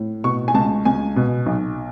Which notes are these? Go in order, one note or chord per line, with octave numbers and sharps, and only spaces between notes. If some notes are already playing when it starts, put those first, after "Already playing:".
Already playing: A2
B2 C#6
G#5
C#2 A5
C#2 G#5
B2
B1